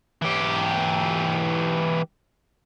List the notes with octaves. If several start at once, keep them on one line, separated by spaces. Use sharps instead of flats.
E3 G4